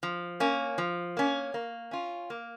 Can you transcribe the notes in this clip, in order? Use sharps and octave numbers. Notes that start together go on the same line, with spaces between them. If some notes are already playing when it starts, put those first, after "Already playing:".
F3
A#3 C#4
F3
A#3 C#4
A#3
C#4 F4
A#3